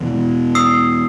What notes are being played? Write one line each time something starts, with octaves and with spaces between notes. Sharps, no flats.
E2 B2 E3
D#6 E6 C7